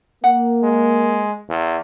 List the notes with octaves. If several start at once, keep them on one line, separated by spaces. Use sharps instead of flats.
A#3 F#5
G#3
E2